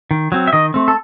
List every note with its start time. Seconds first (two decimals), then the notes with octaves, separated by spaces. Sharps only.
0.11 D#3
0.32 F#3 C4
0.47 E5
0.53 D#3 D#5
0.74 A3 C4
0.88 A4